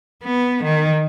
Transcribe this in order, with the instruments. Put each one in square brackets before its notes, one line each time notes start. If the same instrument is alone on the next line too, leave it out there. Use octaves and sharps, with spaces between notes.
[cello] B3
D#3